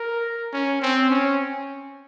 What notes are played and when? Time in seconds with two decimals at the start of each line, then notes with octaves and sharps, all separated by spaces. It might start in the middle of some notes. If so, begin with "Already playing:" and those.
Already playing: A#4
0.53 C#4
0.82 C4
1.10 C#4